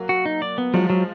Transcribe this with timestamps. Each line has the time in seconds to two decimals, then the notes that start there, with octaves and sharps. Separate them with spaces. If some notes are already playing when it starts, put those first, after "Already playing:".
Already playing: F#3 A#3
0.09 F#4
0.26 D#4
0.42 D5
0.58 B3
0.74 F3 F#3 G#3
0.90 F#3